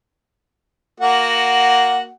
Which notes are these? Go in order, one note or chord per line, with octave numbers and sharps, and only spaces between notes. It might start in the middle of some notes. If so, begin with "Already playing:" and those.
A#3 F#4 F#5